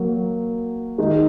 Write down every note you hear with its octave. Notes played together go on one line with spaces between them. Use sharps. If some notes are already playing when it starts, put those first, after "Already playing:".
Already playing: F#3 A#3
D#3 G#3 D#4